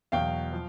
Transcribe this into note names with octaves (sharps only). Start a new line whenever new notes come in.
E2 B2 F#3 F5 G5
F3